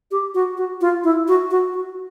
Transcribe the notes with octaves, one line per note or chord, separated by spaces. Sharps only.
G4
F#4
F#4
F4
E4
F#4
F#4
F#4